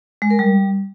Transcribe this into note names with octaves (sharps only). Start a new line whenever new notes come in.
G#3
A#4
G3